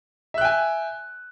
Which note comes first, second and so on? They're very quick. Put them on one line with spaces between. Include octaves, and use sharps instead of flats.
E5 F#6 G5 G#5